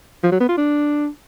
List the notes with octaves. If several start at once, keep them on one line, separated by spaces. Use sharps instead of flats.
F3
F#3
B3
F4
D4